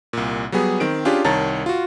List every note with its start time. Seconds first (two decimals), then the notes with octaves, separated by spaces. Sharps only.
0.13 C2 A#2
0.52 F#3 G3 B3 G#4
0.80 D#3 C4 D7
1.05 C#4 D4 F4 G4 G#4
1.24 C2 D#3 C#5 A5 A#5 A6
1.66 F4 F#4